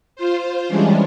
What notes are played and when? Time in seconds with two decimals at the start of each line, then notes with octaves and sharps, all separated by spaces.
0.16 F4 C5
0.68 E3 G3 G#3 C#4 D4